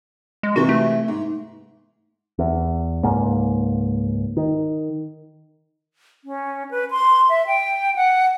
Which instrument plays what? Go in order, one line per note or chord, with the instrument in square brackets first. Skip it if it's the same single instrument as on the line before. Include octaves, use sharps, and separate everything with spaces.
[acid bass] G#3
[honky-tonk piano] C3 E3 [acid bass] F#4
[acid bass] A3
[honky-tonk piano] G#2
[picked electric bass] E2
C#2 G#2 A#3
D#3
[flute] C#4
B4
C6
E5
G5
F#5